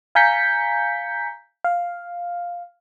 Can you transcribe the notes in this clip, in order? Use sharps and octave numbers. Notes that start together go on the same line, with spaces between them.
F5 G#5 A#5 G6 B6 C#7
F5